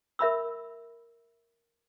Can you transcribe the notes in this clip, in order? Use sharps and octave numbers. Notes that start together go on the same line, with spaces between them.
A#4 E5 B5 E6